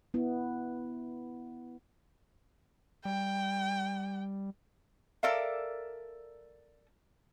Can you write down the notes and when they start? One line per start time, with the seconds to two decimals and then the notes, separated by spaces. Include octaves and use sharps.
0.14 B3 E4
3.05 G3 G5
5.23 A4 A#4 D5 E5 F5